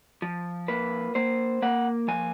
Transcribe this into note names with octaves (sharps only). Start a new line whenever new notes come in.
F3
A#3 B4
A#3 C5
A#3 F#5
F3 G#5